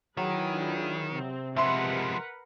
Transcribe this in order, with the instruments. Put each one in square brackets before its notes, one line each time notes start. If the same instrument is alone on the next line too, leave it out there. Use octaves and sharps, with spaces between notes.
[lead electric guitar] D#3 [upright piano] F#3 [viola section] E4 G#4 B4
[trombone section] D4 F4
[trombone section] C3 [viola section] C4
[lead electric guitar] F3 G#3 [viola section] A#4 B4 F#5 [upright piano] E5 C6